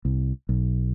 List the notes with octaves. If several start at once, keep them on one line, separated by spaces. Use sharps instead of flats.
C2
B1